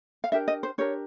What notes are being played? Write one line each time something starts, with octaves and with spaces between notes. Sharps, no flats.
F5
D4 G4 A#4 E5
D#5
C5
D4 G4 A#4 C#5